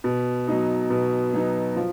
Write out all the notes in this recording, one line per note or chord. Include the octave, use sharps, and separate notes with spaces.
B2
F#3 B3 D#4
B2
F#3 B3 D#4
F3